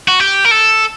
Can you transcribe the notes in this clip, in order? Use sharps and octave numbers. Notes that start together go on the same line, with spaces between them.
F#4
G4
A#4
A4